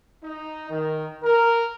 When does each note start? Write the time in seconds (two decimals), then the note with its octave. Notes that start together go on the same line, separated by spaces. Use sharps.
0.23 D#4
0.70 D#3
1.24 A#4